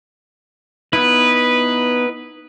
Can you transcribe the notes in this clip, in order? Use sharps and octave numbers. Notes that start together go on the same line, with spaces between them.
B3 D#4 E4 B4